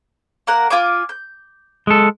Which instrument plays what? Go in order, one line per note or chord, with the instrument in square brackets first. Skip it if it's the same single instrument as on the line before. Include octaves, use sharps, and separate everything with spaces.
[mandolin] A#3 A#4 F#5
F4 G#5 D6
G6
[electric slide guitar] G#3 A4